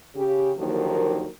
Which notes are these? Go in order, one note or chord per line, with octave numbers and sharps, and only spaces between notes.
C#3 G4
D#2 D3 D#3 F3 F#3 A#3